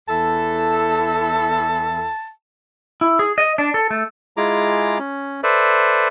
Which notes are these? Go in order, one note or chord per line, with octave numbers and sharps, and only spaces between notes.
E2 E4 A4 A5
E4
G#4
D#5
D4
A4
A3
G#3 E4 F4 G#4 A#5 D6
C#4
A4 B4 C5 D5 E5